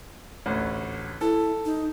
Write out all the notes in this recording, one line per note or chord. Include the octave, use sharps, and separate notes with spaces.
A1 D2
E4 A4
D#4